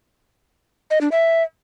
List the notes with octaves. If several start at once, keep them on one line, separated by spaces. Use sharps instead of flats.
D#5
D4
E5